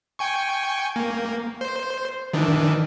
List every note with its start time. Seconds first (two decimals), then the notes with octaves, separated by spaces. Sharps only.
0.19 G5 G#5 C#6
0.96 A#3
1.61 C5
2.33 D#3 E3 D4